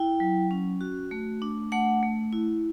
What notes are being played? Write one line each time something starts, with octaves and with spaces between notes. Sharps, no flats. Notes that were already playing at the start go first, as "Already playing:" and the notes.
Already playing: E4 G5
F#3
C#4
F#4
A3
D4
A3 F#5
A3
E4